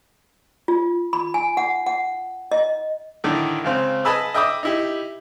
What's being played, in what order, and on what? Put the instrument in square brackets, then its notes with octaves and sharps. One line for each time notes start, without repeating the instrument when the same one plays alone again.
[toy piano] F4
B5
G#5
F#5
F#5
D#5
[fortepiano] A2 D3 D#3 A3
C#2 C#3 C4
B4 D#5 G#5 A5 B5 E6
D#5 E5 G5 B5 D6 D#6
D#4 E4 G4